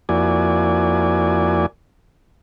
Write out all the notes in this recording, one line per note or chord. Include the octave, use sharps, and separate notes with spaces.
F2 A#3 E4 F#4 D5 G#5